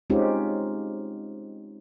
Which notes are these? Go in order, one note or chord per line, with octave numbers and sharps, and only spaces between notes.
G#3 C4 C#4 D#4 F4 G4